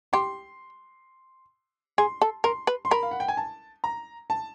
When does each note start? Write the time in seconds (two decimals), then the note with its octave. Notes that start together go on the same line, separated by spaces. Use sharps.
0.13 G4 C6
1.98 G#4 C6
2.22 A4
2.44 A#4 C6
2.67 B4
2.85 C6
2.91 A#4 B5
3.03 F5
3.11 F#5
3.20 G5
3.28 G#5
3.37 A5
3.84 A#5
4.30 A5